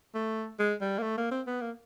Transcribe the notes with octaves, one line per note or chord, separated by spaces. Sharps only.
A3
G#3
G3
A#3
A3
A#3
C4
B3
A#3